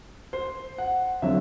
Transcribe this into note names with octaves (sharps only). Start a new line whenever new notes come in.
C5
F#5
D3 F#3 C4 E5